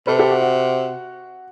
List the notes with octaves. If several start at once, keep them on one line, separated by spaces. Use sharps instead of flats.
C3 A4 B4
G4 A4
F#4
F#4
F#4